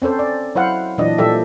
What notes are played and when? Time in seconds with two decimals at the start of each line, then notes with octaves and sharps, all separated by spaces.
0.02 C4 C#4 A4 C5
0.19 D5
0.55 F#3 E4 C5 F5 F#5
0.98 A#2 E3 F#3 D4 D#5
1.18 A#2 F3 G3 G4 A4 E5